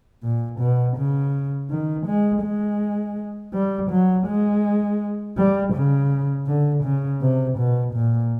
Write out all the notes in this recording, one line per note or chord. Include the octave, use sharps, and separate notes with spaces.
A#2
B2
C#3
D#3
G#3
G#3
G3
F#3
G#3
G3
C#3
D3
C#3
C3
B2
A#2